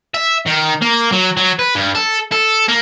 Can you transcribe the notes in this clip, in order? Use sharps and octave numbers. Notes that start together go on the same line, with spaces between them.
E5
D#3
A#3
F#3
F#3
B4
G2
A4
A4
A#3